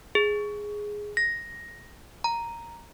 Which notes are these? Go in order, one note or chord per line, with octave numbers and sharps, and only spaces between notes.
G#4
A#6
A#5